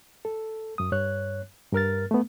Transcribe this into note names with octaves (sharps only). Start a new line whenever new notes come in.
A4
F#2 D#6
G2 C#5 F#6
G2 A#4 F6 A6
A3 B3